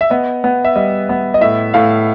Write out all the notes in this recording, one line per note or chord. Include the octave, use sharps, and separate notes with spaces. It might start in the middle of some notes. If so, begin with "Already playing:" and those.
E5
B3 D#5
B3
E5
G3 D#5
B3
D#5
A2 E5
A2 F5